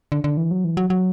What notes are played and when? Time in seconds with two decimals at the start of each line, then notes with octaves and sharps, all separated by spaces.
0.12 D3
0.24 D3
0.37 E3
0.51 F#3
0.64 E3
0.77 F#3
0.90 F#3